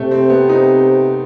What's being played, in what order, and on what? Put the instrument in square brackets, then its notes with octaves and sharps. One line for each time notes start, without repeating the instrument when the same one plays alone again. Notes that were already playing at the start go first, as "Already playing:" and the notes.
Already playing: [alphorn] C3 [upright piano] A3
[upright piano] C4
B3
D#4